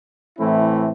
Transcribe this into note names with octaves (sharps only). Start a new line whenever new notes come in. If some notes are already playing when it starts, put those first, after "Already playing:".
A2 E3 A3 C4 E4